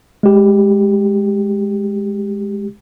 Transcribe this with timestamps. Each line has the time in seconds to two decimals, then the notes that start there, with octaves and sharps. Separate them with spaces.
0.23 G#3 G4